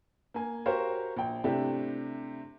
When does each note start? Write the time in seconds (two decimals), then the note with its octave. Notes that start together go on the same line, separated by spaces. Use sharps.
0.34 A#3 G#5
0.66 F#4 G4 A#4 C5 C#5 F5
1.16 A#1 G5
1.44 C3 A3 D4 E4 G4